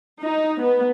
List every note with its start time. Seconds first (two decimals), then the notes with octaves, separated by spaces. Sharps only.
0.21 D#4
0.60 B3